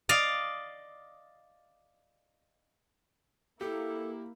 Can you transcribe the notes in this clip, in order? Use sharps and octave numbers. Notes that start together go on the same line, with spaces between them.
D5 D#5 F5
A#3 E4 G4 A4